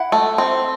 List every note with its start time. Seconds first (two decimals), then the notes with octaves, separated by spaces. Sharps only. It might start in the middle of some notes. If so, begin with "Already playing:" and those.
Already playing: E4 F#5
0.12 A3
0.38 C4